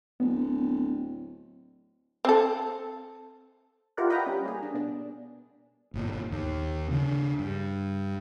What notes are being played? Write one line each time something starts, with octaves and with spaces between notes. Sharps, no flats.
D1 B3
C4 A4
E4 F4 G4 A#4 D5 F#5
B4 D#5 F#5 G5 A#5 B5
G3 C#4
A#3 G#4
D4
B2 D4
G1 A#2
D#2
C#3 C#4 D4
G2